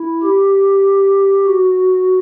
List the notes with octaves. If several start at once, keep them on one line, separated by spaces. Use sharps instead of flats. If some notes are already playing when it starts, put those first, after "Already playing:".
Already playing: E4
G4
F#4